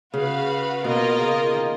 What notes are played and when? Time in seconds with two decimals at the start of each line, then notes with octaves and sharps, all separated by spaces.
0.14 C#3 F#4 B4 F5
0.84 B2 A#3 F4 A#4 D#5
1.19 C#3
1.54 D#3